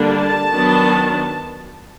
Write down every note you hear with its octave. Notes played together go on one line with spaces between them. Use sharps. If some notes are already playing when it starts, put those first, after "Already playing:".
Already playing: D3 G3 A#3 D4
A5
D#3 F#3 B3 D4